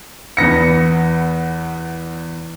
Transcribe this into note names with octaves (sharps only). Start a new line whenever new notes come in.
E2 B3 A#6 C#7